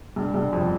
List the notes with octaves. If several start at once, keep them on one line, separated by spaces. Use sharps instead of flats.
G2
G2
F2